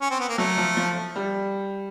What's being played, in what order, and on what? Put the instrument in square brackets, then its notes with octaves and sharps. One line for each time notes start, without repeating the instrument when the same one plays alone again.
[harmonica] C#4
C4
B3
A#3
[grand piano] F#3 [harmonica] A3
[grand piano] F3
F3
G3